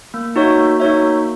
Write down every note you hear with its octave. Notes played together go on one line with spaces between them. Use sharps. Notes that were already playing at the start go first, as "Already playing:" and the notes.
A#3
D#4 F#4 C#5 E5
A#3
D#4 F#4 C#5 E5
A#3